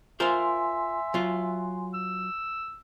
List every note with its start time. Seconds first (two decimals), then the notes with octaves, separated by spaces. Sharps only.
0.20 F4 A#4 C5 E5 G#5 C6
1.14 F#3 F4
1.94 E6